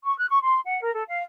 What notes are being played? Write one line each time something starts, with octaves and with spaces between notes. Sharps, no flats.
C#6
F#6
C#6
C6
F#5
A#4
A4
F5